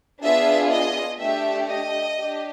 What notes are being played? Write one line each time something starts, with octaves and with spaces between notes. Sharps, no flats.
B3 D4 F4 G#4 E5
D#5
A3 D4 G4 E5
D#5
D4 G4